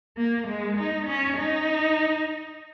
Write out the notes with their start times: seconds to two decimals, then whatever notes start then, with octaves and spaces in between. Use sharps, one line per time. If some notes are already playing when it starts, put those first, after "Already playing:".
0.17 A#3
0.48 G#3
0.78 D#4
1.07 C#4
1.37 D#4